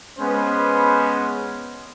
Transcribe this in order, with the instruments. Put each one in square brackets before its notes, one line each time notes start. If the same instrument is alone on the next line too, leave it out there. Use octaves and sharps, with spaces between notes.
[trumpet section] G#3 B3 C#4 B4 C5